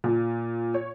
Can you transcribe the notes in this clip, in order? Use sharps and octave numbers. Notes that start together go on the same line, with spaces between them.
A#2
C#5